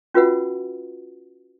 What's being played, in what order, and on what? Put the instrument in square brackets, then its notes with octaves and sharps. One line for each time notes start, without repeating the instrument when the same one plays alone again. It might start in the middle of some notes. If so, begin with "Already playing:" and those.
[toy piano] C#4 F4 F#4 B4 E5 F#5